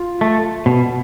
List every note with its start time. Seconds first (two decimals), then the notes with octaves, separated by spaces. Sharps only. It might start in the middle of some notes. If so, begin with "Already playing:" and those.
Already playing: F4
0.21 A3
0.66 B2